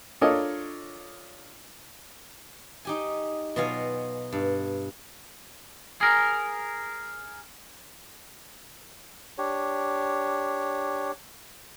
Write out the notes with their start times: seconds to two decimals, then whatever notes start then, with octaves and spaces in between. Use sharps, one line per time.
0.21 D4 F4 A4 A#4 C#5 D#5
2.85 D#4 G4 G#5
3.56 B2 F#3 F4 F5 G#5
4.32 G2
6.01 G#4 A#4
9.38 D4 G4 C#5